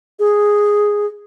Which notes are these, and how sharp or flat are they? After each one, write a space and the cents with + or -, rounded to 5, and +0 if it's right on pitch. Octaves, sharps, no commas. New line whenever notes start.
G#4 -5